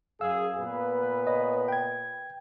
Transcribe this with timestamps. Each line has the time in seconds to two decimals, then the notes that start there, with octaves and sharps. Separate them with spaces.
0.21 F#2 G#4 F5 E6
0.60 A#2 B3 B4
1.27 C#5 D#5
1.68 G5 G#6